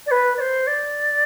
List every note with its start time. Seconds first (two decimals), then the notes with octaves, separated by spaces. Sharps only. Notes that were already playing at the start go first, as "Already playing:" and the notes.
0.06 D5
0.11 B4
0.37 D5
0.40 C5
0.67 D5